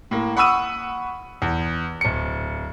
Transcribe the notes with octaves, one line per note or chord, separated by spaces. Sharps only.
A2 A#3
F#5 B5 C#6 D#6 E6 D#7
E2
D1 C#7